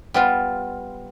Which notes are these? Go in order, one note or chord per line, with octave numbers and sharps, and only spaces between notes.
G3 B3 F4